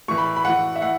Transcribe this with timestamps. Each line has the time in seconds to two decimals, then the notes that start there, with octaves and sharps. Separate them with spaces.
0.08 A2 E3 C#6
0.18 B5
0.36 B5
0.45 A2 E3 F#5
0.76 E5
0.81 A2 F#5